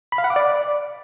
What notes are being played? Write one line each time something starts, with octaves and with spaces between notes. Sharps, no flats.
B5
F5
F#5
D6
D5